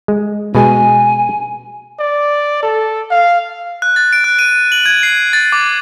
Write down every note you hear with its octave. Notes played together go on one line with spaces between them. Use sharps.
G#3
B2 G#3 G#5
D5
A4
F5
F#6
A6
D7
F#6
D#7
F#7
G#6
C7
A6
D6